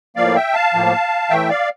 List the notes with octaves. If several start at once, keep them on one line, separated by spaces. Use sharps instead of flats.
A2 F3 A#3 D5 F5
E5 G5
F5 A5
A2 F3 A#3
A2 E3 A3 E5 G5
D5 F5